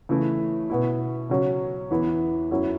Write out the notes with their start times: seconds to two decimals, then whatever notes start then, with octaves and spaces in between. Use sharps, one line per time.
0.09 C#3 E3 A3 E4
0.70 B2 B3 E4
1.30 C#3 F#3 C#4
1.91 E2 E3 B3 E4
2.51 F#2 F#3 C#4 E4